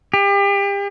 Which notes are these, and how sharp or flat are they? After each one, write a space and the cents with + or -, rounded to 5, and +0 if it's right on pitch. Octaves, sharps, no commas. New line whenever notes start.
G4 +35